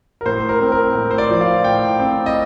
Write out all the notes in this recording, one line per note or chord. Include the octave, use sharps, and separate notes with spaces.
A#4
A2 C5
A#4
C4
A#4
A2
C5
D5
F3
F5
A2 G5
C4
D#5